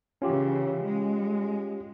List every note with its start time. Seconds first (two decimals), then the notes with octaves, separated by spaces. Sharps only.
0.22 C#3 E3 C#4 F4 G4
0.84 G#3